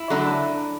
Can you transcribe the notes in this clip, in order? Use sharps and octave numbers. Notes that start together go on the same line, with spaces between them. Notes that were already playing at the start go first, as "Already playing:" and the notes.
Already playing: E4
D3 F#3 A3 D4